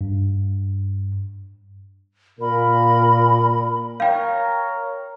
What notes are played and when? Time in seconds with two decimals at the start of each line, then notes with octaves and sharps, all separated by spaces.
0.01 G2
2.40 A#2 A#4 B5
4.00 A#4 C#5 F5 G5 A#5